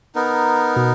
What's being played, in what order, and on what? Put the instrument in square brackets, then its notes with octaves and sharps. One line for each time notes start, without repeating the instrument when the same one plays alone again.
[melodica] B3 D#4 A#4
[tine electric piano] B2